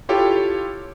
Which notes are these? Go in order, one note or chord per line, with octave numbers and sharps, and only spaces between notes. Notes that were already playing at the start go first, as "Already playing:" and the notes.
E4 F4 G4 A4 C#5